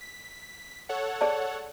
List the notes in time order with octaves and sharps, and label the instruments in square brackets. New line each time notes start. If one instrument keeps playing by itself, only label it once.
[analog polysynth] B6
A4 C#5 F#5
[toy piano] G#4 D5 A5